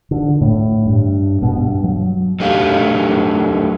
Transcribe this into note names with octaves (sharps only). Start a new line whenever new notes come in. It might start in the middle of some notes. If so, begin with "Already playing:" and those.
D3
A2
G2
B2
G2
F#3
F#3 A3 D4 G4 F5